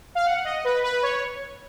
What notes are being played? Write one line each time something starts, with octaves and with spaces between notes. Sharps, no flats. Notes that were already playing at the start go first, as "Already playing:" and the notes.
F5
F#5
D#5
B4
B4
C#5